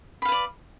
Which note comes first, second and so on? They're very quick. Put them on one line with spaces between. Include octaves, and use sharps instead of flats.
B5 F5 B4 D5